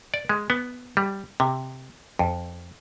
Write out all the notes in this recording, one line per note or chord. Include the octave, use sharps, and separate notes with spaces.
D5
G#3
B3
G3
C3
F2